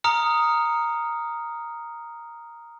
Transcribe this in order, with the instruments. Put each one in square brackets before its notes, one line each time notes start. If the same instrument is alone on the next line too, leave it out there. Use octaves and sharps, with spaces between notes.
[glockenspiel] A#5 D#6 F6 C#7